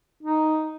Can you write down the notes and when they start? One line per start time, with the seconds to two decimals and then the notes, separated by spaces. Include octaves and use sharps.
0.23 D#4